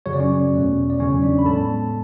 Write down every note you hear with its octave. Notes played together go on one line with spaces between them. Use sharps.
F#2 C#3 F#3 C#5
D5
C#4 C#5
E2 B2 A3
D5
E2 C#3 F#3 C#4 C#5
D4 D5
B5
A2 G#3 B3 A4 A5